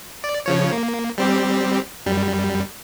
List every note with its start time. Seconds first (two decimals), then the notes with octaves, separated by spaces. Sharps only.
0.24 D5
0.46 C#3 F3 C#5
0.72 A#3
1.18 G3 C4 G4
2.06 F#2 G3